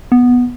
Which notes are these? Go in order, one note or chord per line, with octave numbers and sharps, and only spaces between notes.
B3